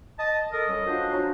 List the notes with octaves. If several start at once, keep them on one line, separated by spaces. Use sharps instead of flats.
D#5 A5
A4 A#4 D#5
G3 C#4 A4
D4 F4 F#4 C5
F#3 C#4 F4